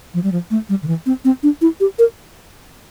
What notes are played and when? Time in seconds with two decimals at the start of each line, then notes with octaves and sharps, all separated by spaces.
0.14 F3
0.24 G3
0.32 F3
0.51 A3
0.69 G3
0.82 D3
0.87 E3
1.06 C4
1.25 C4
1.43 D4
1.61 E4
1.80 G4
1.99 A#4